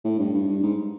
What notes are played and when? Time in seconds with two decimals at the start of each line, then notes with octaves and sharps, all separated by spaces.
0.05 A2
0.19 G2
0.34 G2
0.48 G2
0.63 G#2